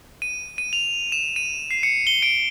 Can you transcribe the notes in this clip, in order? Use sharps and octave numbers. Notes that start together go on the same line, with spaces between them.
D#7
D#7
F7
E7
D#7
C7
C#7
G7
D7